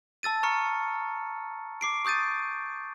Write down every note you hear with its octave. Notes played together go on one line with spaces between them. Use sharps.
A5 E6 A6 D#7
A#5 C#6 F6 C#7
D6 C7 D7
C#6 D#6 G6 A6 D#7